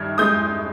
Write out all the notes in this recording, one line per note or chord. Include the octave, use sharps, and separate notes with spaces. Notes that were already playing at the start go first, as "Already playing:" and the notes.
Already playing: G2 D#3 F6 G#6
G#3 D#6 G6